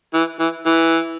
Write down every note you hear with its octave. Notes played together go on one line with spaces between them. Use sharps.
E3
E3
E3